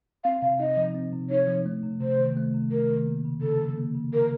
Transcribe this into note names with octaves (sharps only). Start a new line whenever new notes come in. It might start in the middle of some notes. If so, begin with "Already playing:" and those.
C4 F5
C3 F5
D#4 D#5
F3
C4
C3
D#4 C#5
F3
A3
C3
C3 C5
D#3
A3
C3
C3 A#4
D#3
A#3
C#3
C#3 A4
F3
A#3
C#3
C#3 A#4